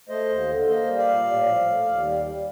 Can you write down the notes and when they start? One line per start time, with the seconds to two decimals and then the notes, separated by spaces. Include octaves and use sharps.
0.09 A3 C5 D#5
0.28 D#2
0.48 D3
0.67 A#3 C5 D#5
0.88 G3
0.98 D5 F5
1.08 A#2
1.27 A2
1.46 F3
1.67 A3
1.86 D#2
2.05 G3
2.25 G3